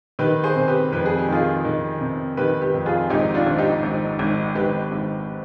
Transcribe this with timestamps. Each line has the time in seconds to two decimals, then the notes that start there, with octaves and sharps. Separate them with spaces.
0.19 D#3 G4 B4
0.44 G#4 C5
0.56 C3
0.68 G4 B4
0.92 F2 B4
1.06 G#4
1.19 G4
1.28 D#3 F4 G#4
1.65 D#3
2.01 C3
2.37 D#3 G4 B4
2.62 G4 B4
2.74 F2
2.86 F4 G#4
3.10 G#1 D#4 G4
3.34 D4 F4
3.46 G#1
3.58 D#4 G4
3.83 G#1
4.19 G#1
4.55 G#1 G4 B4
4.92 G#1